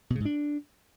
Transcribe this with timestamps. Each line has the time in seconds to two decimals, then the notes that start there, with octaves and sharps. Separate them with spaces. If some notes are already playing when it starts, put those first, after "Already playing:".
0.10 B2
0.15 C#3
0.20 G#2
0.25 D4